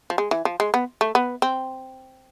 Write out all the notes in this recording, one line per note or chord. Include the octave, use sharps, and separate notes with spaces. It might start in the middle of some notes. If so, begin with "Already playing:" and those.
F3
G#3
E3
F3
G#3
B3
A3
B3
C4